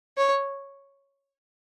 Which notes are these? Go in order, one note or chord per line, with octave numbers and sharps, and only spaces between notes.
C#5